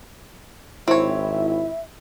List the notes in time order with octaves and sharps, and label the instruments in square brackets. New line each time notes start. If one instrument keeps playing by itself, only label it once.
[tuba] G#1 [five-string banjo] C4 C#5 [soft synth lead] E4 [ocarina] E5